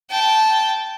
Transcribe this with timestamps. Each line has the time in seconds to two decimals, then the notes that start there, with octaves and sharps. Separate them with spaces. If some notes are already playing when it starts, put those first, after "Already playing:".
0.10 G5 A5